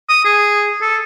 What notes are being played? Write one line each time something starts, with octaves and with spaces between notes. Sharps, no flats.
D#6
G#4
A4